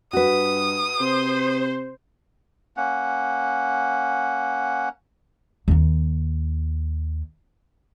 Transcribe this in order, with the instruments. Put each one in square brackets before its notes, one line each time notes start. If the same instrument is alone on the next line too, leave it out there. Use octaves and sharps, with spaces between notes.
[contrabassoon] G2 [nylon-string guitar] F#4 B4 [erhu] D#6
[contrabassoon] C3 [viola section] C5
[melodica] A#3 C#4 F#5
[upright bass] D#2 D#4